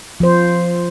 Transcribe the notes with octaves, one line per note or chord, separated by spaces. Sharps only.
F3 C5